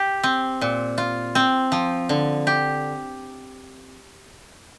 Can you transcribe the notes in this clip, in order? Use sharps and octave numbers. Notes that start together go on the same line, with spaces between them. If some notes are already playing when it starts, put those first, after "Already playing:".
Already playing: G4
C4
A#2
F4
C4
F3
D3
G4